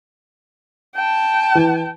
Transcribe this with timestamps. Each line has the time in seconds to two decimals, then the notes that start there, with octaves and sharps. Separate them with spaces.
0.95 G5 A5
1.55 E3